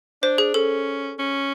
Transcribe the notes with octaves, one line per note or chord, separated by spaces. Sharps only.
D4 C5
G#4
C#4 A4
C#4